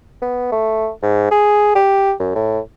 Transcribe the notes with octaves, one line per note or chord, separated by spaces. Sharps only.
B3
A3
G#2
G#4
G4
F#2
A2